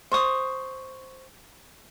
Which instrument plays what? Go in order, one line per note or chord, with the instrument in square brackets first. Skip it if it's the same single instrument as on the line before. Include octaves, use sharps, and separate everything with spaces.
[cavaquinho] C5 C#6 D#6